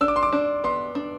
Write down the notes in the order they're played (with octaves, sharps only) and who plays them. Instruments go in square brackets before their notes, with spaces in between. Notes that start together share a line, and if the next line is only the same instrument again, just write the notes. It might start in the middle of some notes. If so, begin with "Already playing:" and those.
[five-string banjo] D4 [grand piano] E6
[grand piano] D6
C6
D6
[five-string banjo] D4
[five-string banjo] B3 [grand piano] C6
[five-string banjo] D4